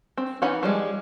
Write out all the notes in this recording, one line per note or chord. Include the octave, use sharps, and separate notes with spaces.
C4
E3 C#4 D#4 F#5 B5
F3 G3 G#3